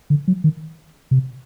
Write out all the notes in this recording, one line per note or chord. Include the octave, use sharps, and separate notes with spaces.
D3
F#3
D#3
C3